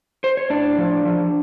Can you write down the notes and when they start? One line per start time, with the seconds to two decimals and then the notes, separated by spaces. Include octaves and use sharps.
0.24 C5
0.37 C#5
0.50 A2 D4 D5
0.78 F3
1.05 F3